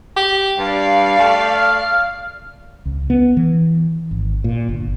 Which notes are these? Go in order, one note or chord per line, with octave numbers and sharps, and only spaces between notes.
G4
G2 D5 F5
A3 G5
F6
C#2
B3
E3
G#1
A#2
G1